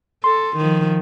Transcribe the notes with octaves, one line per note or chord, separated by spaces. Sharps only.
A4 C6
D#3 F3